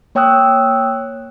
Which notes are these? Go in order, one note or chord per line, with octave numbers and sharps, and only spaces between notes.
A#3 C#5 G5 D#6 E6 F#6